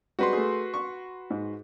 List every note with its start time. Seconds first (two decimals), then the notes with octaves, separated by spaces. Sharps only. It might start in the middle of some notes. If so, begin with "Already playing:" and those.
0.19 G3 G#3 C4 F#4 B4 C6
0.33 A3 G#4
0.74 C#6
1.30 G#2